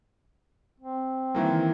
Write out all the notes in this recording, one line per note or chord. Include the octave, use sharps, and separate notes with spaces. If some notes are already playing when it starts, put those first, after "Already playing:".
C4
D#3 E3 A#3